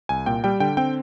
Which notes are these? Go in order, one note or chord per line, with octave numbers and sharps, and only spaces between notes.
C2 G#5
A#2 G5
G3 G5
D3 G5
C4 G5